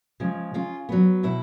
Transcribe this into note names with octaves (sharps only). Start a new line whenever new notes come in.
C#3 F3 G#3
C#3 F4
F#3 B3
B2 E4